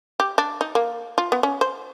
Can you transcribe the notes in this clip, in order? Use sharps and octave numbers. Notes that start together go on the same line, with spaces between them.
G4
D4
D#4
A#3
F4
B3
C#4
C5